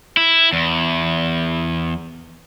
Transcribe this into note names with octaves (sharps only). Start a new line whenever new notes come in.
E4
E2